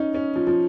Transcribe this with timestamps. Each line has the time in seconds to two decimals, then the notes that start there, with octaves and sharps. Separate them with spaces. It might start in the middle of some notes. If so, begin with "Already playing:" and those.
Already playing: C#4 D#4
0.14 C#4
0.36 F3
0.47 F3